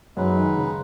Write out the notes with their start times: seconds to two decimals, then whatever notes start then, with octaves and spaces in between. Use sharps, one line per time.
0.16 F#2 F#3 G#3 D#4 B4
0.36 D#3
0.57 C#3